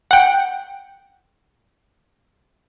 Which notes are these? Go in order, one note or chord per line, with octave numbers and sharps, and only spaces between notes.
F#5 G5